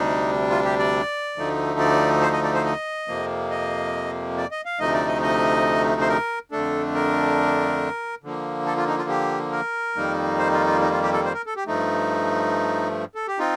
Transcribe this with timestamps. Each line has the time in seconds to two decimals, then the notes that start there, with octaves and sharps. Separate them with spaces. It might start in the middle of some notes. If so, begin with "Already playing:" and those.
Already playing: D2 C3 G3 D4 D#4
0.50 F4
0.65 G4
0.79 D5
1.36 D2 D3 F3 A3 D#4
1.79 D5
2.22 C5
2.33 D#5
2.44 D5
2.55 C5
2.65 D#5
3.08 F2 C3 F3 A#3
3.51 D#5
4.37 D5
4.51 D#5
4.65 F5
4.79 D2 C3 F3 A3 D#4 D#5
4.94 D5
5.07 D#5
5.22 D#5
6.01 C5
6.09 A#4
6.52 F2 D3 A3 D4 A4
6.95 A#4
8.23 D3 F3 A#3
8.66 A4
8.77 F4
8.88 D#4
8.98 F4
9.09 G4
9.52 A#4
9.95 F2 D#3 G3 A#3 D#4
10.38 C5
10.53 F4
10.67 F4
10.82 D#4
10.92 F4
11.03 G4
11.13 A4
11.25 C5
11.34 A#4
11.46 A4
11.56 G4
11.67 G2 F3 A3 D#4
13.15 A4
13.27 G4
13.39 C4 D#4 F4